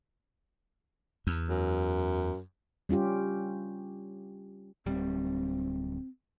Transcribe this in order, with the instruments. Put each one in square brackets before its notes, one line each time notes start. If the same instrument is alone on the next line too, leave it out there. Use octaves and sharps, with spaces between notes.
[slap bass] E2
[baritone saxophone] F#2
[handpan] G3 C#4 F4 G4
[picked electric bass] D1 G3 [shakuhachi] C4